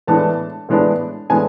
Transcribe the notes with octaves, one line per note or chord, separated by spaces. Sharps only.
A2 E3 G#3 B3 D4 A5
A2 E3 G#3 B3 D4
A2 E3 G#3 B3 D4 G#5